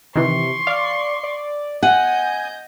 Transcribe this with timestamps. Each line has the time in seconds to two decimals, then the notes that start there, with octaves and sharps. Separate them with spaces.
0.16 C3 D#3 E3 C6 C#6
0.67 D5 F5
1.23 D5
1.83 D#5 F#5 G#5 G6